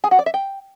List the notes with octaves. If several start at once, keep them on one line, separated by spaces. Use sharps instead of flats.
G#4
F#4
D5
E5
G5